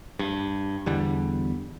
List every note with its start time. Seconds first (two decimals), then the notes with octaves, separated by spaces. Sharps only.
0.19 G2
0.86 E2 D3 G3